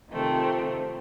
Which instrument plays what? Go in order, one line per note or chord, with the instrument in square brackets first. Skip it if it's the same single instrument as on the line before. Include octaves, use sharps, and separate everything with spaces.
[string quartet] C3 D#3 F3 A3 C4